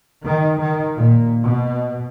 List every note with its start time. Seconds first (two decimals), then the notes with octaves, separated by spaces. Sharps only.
0.25 D#3
0.60 D#3
0.97 A#2
1.44 B2